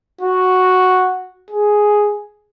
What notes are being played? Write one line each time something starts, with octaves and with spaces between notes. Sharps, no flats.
F#4
G#4